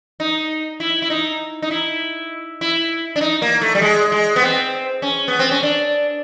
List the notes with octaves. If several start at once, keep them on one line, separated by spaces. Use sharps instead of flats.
D#4
E4
E4
D#4
D#4
E4
E4
D4
D#4
A#3
A3
G3
G#3
G#3
B3
C4
C#4
B3
C4
C#4
D4